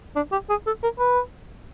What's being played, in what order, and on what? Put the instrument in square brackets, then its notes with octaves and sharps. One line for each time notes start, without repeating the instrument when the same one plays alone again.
[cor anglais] D4
G4
G#4
A4
A#4
B4